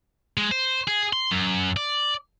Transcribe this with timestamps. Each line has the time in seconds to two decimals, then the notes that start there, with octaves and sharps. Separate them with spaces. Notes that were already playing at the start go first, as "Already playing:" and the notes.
0.37 G#3
0.52 C5
0.88 G#4
1.13 C6
1.31 F#2
1.77 D5